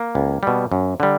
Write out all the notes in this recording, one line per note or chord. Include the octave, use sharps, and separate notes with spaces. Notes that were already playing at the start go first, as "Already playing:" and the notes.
Already playing: A#3
C#2
B2 G3
F#2
D3 G3